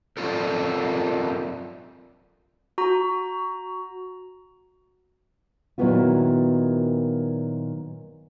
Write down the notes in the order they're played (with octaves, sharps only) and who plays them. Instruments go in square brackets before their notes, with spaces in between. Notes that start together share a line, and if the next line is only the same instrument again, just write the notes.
[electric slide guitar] F#3 C4 D4 F4 A4 A#4
[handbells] F#4 A#5
[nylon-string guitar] A#2 D#3 F#3 B3 E4 F4